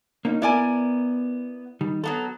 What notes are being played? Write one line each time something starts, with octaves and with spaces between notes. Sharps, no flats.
A#3 C#4 D#4
B3 E4 A#4 D5 G#5
D#3 G3
F#3 B3 A4 A#5